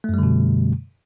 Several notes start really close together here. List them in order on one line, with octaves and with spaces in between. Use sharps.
A3 F#2 G3 D3 B2